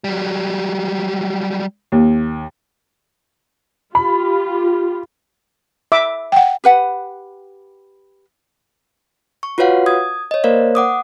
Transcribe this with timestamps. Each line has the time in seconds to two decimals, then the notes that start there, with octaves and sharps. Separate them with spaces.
0.04 F#3 G3
1.92 D#2
3.95 F4 G4 B5
5.92 E5 D6
6.32 F#5 G5
6.64 G4 B4 F#5
9.43 C#6
9.58 F4 F#4 B4 C#5 F5 F#5
9.86 D#6 G#6
10.31 C#5 D#5
10.44 A#3 A#4 C5 D5 F5
10.75 F#5 D6 D#6